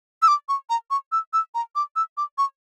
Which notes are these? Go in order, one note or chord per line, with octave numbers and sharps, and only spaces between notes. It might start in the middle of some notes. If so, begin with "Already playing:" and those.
E6
D6
C#6
A#5
C#6
E6
E6
A#5
D6
E6
D6
C#6